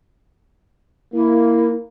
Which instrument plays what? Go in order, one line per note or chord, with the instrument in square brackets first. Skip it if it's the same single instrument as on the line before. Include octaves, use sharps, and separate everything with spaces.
[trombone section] A#3 [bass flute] E4